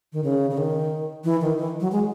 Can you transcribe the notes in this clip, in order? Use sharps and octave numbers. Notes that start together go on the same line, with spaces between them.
D#3
C#3
C#3
D#3
E3
D#3
E3
F#3
G#3